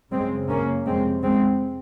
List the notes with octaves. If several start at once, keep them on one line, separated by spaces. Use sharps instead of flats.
F#2 C#3 G#3 C4
A#3 C#4
F2 C3 G#3 C4
G#3 C4